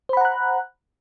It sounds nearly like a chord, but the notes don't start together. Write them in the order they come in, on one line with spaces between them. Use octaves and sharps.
C5 B5 F#5 A#5 F#6